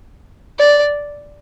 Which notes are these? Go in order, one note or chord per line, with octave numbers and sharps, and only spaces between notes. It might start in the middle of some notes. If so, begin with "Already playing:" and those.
D5